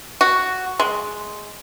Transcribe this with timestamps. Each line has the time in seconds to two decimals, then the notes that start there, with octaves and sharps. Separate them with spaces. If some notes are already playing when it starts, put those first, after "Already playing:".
0.21 F#4
0.80 G#3